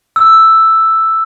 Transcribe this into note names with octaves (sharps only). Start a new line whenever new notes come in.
E6